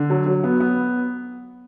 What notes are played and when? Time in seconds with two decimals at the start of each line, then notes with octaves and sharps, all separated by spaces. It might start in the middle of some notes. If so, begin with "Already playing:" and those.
Already playing: D3
0.10 F#3
0.26 F#3
0.44 B3
0.60 B3